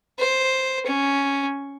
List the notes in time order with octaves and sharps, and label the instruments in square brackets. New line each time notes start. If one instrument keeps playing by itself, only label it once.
[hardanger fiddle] C5
C#4